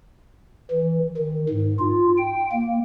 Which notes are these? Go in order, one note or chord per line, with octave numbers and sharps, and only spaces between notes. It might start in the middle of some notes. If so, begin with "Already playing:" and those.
E3
D#3
G#2
F4
G5
A#3